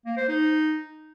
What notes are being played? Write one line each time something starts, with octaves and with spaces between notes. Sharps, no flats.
A#3
C5
D#4